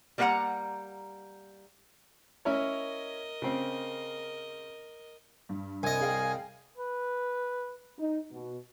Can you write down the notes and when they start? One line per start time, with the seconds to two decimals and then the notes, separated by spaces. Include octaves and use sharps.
0.18 G3 A#3 B4 F5 F#5 A#5
2.45 C#4 E4 A#4 C#5 D#5
3.42 C#3 C4
5.49 G2
5.83 C2 D#5 G#5
6.01 G#4 F5 G5
6.77 B4
7.98 D#4
8.31 B2